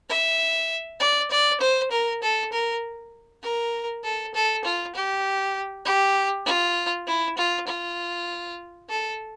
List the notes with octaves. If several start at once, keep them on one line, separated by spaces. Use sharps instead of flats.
E5
D5
D5
C5
A#4
A4
A#4
A#4
A4
A4
F4
G4
G4
F4
E4
F4
F4
A4